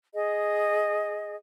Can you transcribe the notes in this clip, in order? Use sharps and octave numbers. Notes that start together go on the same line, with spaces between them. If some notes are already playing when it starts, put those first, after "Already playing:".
G#4 D#5